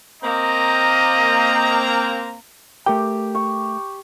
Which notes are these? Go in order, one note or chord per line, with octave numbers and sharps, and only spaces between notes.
A#3 C4 D#5 A#5
A3 G4 A#4 G5
C#6